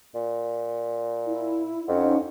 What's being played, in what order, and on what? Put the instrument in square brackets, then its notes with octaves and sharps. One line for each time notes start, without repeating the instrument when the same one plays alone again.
[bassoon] A#2
[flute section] E4
[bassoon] F2 [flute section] C#4 D#4 F#5